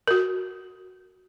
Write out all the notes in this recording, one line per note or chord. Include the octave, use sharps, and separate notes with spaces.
F#4 A#4